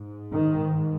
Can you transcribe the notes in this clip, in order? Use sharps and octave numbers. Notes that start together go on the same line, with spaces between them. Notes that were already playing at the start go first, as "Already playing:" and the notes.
Already playing: G#2
D#3